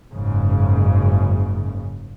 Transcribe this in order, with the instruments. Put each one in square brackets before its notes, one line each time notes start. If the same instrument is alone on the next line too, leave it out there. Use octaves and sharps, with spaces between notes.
[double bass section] F#1 G#2 C#3